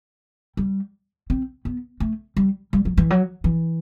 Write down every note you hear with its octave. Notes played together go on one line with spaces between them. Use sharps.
G3
C4
B3
A3
G3
G3
F#3
E3
F#3
E3